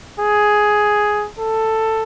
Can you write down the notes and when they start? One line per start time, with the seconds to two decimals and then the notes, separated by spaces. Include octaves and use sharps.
0.20 G#4
1.39 A4